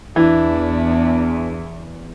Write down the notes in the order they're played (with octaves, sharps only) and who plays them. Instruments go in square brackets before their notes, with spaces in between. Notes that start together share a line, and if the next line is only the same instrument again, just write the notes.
[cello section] E2 [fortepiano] E3 [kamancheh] D4 E4